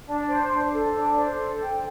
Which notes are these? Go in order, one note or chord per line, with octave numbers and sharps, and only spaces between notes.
D4
C5
D4
A4
D4
C5
A4
G5